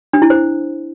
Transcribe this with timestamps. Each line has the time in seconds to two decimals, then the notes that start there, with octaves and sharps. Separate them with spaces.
0.13 D4
0.22 E4
0.30 C5